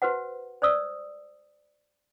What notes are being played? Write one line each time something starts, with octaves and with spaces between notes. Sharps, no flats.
F#4 B4 C5 F#5
C5 D5 D#6 E6